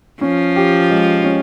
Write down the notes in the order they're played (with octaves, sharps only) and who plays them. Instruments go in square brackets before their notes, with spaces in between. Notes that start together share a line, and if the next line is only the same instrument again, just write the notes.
[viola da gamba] F3 [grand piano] C#4
[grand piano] G4
G#3
C#4